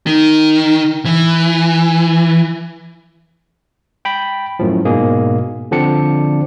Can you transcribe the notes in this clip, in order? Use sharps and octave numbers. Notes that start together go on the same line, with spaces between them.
D#3
E3
G5 B5
F#2 A2 F3
G#2 B2 A#3 G#4
D3 F3 C4 D4 D5 C#7